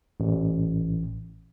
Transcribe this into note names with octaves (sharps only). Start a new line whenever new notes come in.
A1